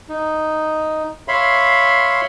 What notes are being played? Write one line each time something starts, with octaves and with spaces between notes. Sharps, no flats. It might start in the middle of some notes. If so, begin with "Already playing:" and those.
D#4
C#5 E5 F5 B5 C6